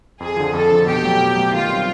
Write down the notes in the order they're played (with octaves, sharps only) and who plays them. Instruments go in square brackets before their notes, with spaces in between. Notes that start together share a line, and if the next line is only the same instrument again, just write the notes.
[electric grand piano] F2 [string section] G#4
[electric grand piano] D3 F3
[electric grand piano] F2 [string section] A4
[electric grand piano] D3 F3
[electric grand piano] B2 [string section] G4
[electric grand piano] F#3 A3
B2
F#3 A3
[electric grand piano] D#3 [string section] F4
[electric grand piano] G3 C4